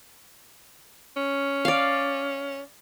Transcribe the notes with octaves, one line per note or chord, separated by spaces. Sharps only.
C#4
D5 F5